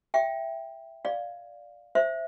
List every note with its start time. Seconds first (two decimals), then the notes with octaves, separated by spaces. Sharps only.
0.14 E5 G5
1.05 D5 F5
1.95 C5 E5